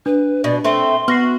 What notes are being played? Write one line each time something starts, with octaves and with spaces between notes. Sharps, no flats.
D4 B4
B2 D5
A3 C4 C6
B3 F#4 F6 A#6 C7